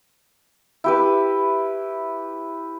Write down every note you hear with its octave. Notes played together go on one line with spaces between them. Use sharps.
E4 G4 B4